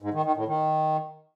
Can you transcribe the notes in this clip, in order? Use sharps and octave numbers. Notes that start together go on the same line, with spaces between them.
G#2
D#3
D#3
A2
D#3